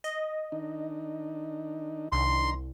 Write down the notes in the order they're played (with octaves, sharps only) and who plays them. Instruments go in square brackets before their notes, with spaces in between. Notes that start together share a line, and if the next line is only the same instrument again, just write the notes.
[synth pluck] D#5
[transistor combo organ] D#3 D4 D#4
[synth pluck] C2 [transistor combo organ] D#3 D4 A#5 [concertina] C6